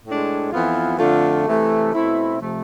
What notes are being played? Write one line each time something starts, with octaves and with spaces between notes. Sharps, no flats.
A2 G#3 D4
F2 E3 B3 F4
F2 D3 A3 D4 F4
C3 E3 A3
B2 A3 C4 E4
C3 F3 A3